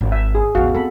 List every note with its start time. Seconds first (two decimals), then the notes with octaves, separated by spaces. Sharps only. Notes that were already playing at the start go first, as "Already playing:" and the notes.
0.01 G#1
0.12 E5
0.35 G#4
0.55 A1 E2 F#4 F5
0.74 B3 C4 A4 B5